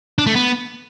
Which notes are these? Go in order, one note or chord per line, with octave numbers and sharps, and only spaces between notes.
D4
A3
B3